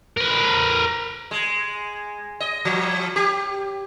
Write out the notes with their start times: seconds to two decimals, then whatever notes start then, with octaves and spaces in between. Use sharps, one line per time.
0.17 A#4 B4
1.31 G#3
2.40 D#5
2.65 F3
3.16 G4